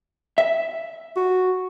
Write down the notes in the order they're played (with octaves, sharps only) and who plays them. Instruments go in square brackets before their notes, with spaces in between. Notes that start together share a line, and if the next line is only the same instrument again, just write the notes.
[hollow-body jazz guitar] E5
[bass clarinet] F#4